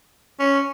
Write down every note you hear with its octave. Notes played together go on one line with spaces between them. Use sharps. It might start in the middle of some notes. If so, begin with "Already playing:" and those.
C#4